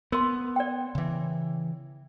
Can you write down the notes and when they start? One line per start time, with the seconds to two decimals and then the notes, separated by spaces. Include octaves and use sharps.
0.12 B3 A#4 C6
0.56 D5 G5
0.95 C#3 E3